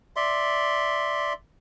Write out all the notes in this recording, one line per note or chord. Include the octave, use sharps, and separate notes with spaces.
D5 E5 C6